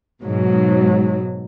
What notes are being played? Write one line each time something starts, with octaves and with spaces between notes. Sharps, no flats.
G#2 B2 F#3